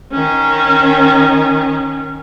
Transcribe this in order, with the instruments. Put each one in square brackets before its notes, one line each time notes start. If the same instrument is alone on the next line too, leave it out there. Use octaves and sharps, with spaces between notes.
[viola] D#3 C#4